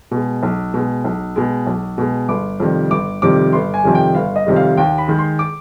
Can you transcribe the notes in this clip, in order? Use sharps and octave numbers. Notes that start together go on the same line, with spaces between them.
B2 G#3
B1
B2 G#3
B1
B2 G#3
B1
B2 G#3
G1 D6
F2 C3 D#3 G3
G1 D6
F2 C3 D#3 G3 D6
G1 C6
G#5
F2 C3 D#3 G3
G5
G1 F5
D#5
F2 C3 D#3 G3
F5
D#2 G5
B5
D#3 G#3
C6
D6